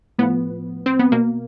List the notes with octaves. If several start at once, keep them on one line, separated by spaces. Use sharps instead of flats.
A2 F3 B3
C4
B3
B2 A#3